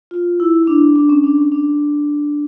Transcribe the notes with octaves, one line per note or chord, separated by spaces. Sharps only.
F4
E4
E4
D4
D4
C#4
D4
C#4
D4